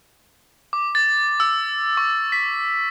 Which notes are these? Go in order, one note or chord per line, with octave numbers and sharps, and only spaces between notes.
D6
A6
E6
C#6
B6